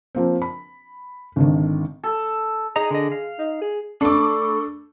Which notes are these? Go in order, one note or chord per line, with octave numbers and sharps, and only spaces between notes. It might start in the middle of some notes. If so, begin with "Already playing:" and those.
F3 A#3 C4
B5
G#1 D3 D#3
A4
D#4 G#4 D#5 A#5
D3 D#5
F5
D#4
G#4
A3 D4 A4 B5 C#6 D6